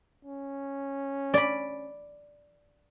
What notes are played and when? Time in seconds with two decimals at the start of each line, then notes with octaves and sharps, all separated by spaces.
0.25 C#4
1.34 D5 B5